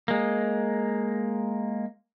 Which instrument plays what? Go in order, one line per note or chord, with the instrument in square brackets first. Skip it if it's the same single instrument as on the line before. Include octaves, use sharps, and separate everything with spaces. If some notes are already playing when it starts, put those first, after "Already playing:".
[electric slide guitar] G#3 A#3